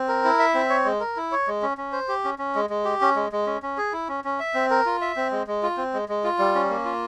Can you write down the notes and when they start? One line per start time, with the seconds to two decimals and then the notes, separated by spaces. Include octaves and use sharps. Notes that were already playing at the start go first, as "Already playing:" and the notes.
Already playing: C4
0.08 A#4
0.24 E4
0.39 E5
0.54 C4
0.70 C#5
0.85 G#3
1.00 A#4
1.17 E4
1.32 C#5
1.47 G#3
1.62 C#4
1.78 C#4
1.92 C5
2.08 G4
2.24 C#4
2.39 C#4
2.55 G#3
2.70 G#3
2.85 G4
3.01 C#4
3.16 G#3
3.32 G#3
3.46 C#4
3.62 C#4
3.78 G#4
3.93 E4
4.08 C#4
4.24 C#4
4.40 E5
4.54 C4
4.70 A#4
4.86 F4
5.02 E5
5.16 C4
5.31 G#3
5.47 G#3
5.63 F4
5.77 C4
5.93 G#3
6.09 G#3
6.24 F4
6.39 G3
6.55 C#4
6.70 A#3
6.85 F4